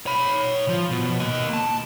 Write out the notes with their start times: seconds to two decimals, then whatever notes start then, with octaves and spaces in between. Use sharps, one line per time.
0.06 C#5 B5
0.68 F3
0.91 B2
1.20 A#3 D#5
1.53 A5